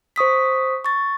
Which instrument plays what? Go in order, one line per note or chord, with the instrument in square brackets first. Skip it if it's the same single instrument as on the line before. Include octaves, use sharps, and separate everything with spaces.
[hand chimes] C5 C#6 D#6 B6
C#6 A6